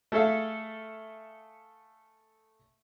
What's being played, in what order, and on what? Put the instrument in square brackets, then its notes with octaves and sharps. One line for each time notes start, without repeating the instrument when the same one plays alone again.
[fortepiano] A3 G#4 A4 E5 F5